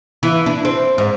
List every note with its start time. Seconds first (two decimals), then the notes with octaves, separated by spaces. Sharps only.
0.23 E3
0.46 D4
0.65 C4
0.98 G#2